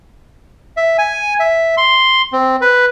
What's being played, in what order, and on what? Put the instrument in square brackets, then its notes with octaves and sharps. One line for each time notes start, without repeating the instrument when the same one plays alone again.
[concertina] E5
G#5
E5
C6
C4
B4